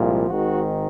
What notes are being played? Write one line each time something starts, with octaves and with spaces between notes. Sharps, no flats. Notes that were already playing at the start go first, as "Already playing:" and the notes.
Already playing: C2 A#2 F3 G#3
G#1 G#2 D#3 F#4